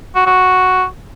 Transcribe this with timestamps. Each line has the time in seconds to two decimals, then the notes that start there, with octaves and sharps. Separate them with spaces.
0.15 F#4
0.26 F#4